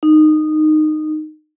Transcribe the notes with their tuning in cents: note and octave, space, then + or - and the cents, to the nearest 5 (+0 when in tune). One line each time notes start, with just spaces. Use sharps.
D#4 -15